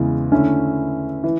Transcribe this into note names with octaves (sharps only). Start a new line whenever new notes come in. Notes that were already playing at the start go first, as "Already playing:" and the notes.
Already playing: E2 C#3 E3 G#3
D3 A3 C#4 E4
E3